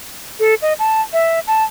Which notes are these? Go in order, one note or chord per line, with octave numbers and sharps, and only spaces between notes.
A4
D#5
A5
E5
A5